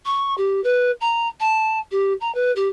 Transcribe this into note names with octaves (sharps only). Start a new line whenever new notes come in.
C#6
G4
B4
A#5
A5
G4
A#5
B4
G4